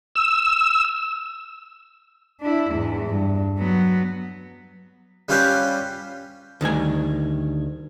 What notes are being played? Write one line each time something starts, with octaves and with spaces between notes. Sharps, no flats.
E6
D4 E4
E2 G#2
G2
F#3 B3
G3 C#4 F4 G4 B4 C5
D2 D#3 G3 G#5